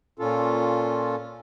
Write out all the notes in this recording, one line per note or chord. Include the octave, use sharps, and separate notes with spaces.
A#2 C#4 F4 A4